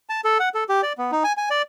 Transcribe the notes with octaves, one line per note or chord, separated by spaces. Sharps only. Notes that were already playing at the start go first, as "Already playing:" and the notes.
A5
A4
F#5
A4
G4
D5
B3
D#4
G#5
G#5
D5